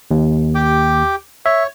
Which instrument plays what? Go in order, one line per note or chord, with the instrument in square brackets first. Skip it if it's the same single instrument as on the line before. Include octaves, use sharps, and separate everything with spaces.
[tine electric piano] D#2
[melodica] G4 G5 D6
[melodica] C#5 [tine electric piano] E5